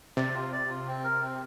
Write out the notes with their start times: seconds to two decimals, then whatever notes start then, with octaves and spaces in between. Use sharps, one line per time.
0.17 C3 D5
0.34 F4
0.52 D5
0.70 F4
0.87 C4
1.04 A#4
1.22 C4